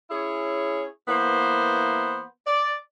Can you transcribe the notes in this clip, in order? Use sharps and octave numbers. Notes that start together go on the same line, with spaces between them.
C#4 E4 G#4 C#5
E3 A#3 B3 C5
D5